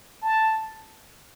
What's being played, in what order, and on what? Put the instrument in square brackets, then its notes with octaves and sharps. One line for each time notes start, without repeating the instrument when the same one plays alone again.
[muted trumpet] A5